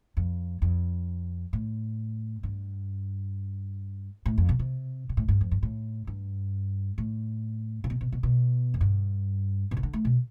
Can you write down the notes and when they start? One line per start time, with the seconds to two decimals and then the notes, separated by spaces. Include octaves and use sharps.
0.17 F2
0.62 F2
1.53 A2
2.43 G2
4.26 A2
4.38 F2
4.49 B2
4.59 C3
5.09 B2
5.17 A2
5.28 G2
5.41 F2
5.51 G2
5.63 A2
6.07 G2
6.98 A2
7.84 C3
7.90 B2
8.01 B2
8.12 B2
8.23 B2
8.74 F2
8.81 G2
9.71 B2
9.77 C3
9.83 D3
9.93 A3
10.05 B2